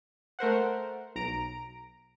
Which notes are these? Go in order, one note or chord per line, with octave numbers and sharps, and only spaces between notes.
A3 A#4 C5 F#5
B1 A#5 D7